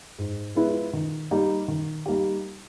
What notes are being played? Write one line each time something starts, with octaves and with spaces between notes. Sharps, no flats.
G#2
F3 G#3 B3 E4
D#3
G3 A#3 D#4 G4
D#3
G3 A#3 D#4 G4